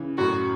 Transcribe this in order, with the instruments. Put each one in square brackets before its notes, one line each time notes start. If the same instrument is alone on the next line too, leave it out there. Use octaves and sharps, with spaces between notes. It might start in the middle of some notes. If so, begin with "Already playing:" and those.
Already playing: [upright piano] C#3 E3
[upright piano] F#2 A2 [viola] F#4